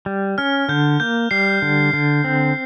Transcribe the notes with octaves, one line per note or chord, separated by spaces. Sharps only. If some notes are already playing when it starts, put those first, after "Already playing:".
G3
C#4 F6
D3 G6
A#3 G6
G3 C7
D3
D3
C4